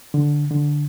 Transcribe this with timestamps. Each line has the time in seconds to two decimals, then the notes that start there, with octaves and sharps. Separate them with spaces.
0.14 D3
0.51 D3